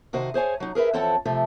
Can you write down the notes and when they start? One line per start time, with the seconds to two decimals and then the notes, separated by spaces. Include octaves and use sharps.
0.13 C3 D#3 F#4 C5 D#5
0.34 G#4 C5 C#5 G#5
0.60 F#3 D#4
0.75 G#4 A#4 B4 E5
0.93 F2 E3 C4 A4 C#5 F#5
1.25 C3 F3 A3